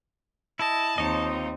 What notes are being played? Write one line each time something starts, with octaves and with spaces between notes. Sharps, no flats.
E4 D#5 A5
D#2 C4 D#4 F4 C#5 D#5